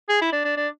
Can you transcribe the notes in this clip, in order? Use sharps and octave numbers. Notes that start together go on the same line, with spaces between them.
G#4
E4
D4
D4
D4